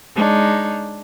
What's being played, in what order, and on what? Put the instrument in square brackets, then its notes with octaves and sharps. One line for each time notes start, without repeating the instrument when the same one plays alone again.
[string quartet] G#3 D4 D#4 C#5